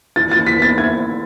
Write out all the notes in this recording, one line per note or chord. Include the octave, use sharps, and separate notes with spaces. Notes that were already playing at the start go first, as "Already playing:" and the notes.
E3 A6
A6
E3
B6
B3 A6
E4 G#6